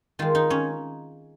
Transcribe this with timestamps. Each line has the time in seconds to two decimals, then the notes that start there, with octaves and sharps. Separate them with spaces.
0.19 D#3 G#3 F4
0.35 D#4
0.50 C#4